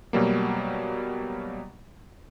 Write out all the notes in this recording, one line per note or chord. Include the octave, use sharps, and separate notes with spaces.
B2 F#3 G3 A#3